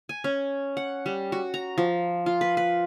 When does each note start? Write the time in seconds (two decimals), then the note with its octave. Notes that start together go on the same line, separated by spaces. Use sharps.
0.09 G#5
0.24 C#4
0.77 F#5
1.06 G3
1.32 F#4
1.54 A#5
1.78 F3
2.26 F4
2.41 B4
2.57 B4